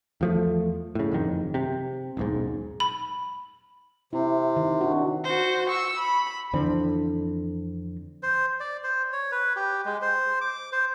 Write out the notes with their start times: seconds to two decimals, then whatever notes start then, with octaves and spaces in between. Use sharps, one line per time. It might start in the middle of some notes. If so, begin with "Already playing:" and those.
0.21 E2 F3 A3
0.95 A2 C#3
1.12 F#1 F2 D#3
1.54 C3
2.17 D#1 B1 G#2
2.80 B5
4.13 C3 E4
4.57 D#3
4.81 D4 F#4
5.24 F#4 C5
5.69 C#6 E6
5.98 B5
6.53 F2 D3 E3 C4
8.23 C5
8.60 D5
8.84 C5
9.13 C#5
9.32 B4
9.56 G4
9.86 G#3
10.02 C5
10.41 D6
10.72 C5